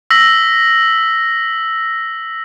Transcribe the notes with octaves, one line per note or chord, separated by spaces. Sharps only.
E6 A#6 B6 F#7